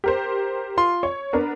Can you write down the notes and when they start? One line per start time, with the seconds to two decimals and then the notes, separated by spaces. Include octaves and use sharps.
0.04 G4 A#4 C5
0.77 F4 C6
1.03 C#5 C#6
1.33 B3 D4 A#4